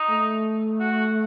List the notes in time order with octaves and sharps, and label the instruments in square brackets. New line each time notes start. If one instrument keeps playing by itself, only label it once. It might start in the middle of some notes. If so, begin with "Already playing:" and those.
Already playing: [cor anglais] D#4
[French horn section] A3
[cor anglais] F#4